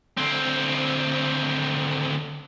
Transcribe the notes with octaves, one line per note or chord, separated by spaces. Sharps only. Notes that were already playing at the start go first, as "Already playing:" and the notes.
D2 C4